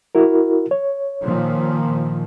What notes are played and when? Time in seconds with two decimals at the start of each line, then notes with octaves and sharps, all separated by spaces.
0.15 E4 F#4 A#4
0.71 C#5
1.22 A#2 D#3 F3